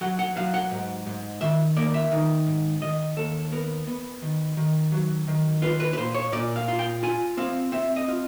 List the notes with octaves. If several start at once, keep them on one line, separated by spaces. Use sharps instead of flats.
F#3 F#5
F#5
F#3 F5
F#5
G#2
G#2
D#3 E5
A#3 D5
E5
D#3
G#2
D#3 D#5
D#2 A4
B3 A#4
B3
D#3
D#3
F#3
D#3
F4 B4
B4
B4
A#2 C5
C#5
A#2 D5
F5
F4
G5
F4 G#5
C4 F5
C4 E5
D#5
F4